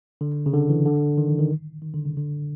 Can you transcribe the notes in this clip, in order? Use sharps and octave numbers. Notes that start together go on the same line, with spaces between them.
D3
C#3
D3
E3
D3
D#3
E3
D#3
D#3
D3
C#3
D3